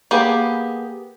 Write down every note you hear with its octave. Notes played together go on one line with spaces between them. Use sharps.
A#3 B3 G4 G#4 B4